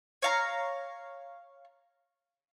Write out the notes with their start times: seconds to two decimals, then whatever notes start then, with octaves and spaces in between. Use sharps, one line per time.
0.22 C#5 F5 A#5